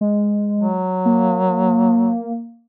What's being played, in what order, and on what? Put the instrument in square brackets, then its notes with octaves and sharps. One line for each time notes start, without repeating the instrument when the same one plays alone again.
[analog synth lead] G#3
[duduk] F#3
[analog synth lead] A#3